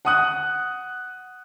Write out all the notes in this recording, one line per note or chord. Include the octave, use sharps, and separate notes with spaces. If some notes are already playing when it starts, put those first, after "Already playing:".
F#5 D#6 F#6